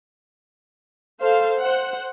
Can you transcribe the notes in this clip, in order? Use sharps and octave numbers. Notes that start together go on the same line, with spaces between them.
A4 C5 F5
C5 F#5